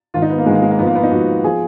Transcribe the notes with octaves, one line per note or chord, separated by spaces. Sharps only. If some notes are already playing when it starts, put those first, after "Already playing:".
G#2 D#3 F4
D#4
B3
A#3
G#2 D#3 G#3 A#3
G#3
A#3
G#2 F3 B3
A#3
B3
D#4
G#2 F3 F#4
F3 G#4